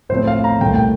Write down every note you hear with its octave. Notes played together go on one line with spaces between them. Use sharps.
A2 F3 C4 C5
F5
A#5
C2 A#2 A3 G5
G5